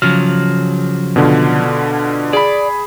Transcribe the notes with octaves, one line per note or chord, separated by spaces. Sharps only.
C#3 F3 F#3 F6
B2 D3 F4
G#4 D5 B5